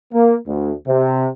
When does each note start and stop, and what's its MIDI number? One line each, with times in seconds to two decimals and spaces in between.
0.13 0.36 58
0.47 0.73 38
0.87 1.27 48